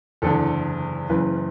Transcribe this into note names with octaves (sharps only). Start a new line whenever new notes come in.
F#1 E2 D3 A4
F#1 F#2 C#3 E3 B4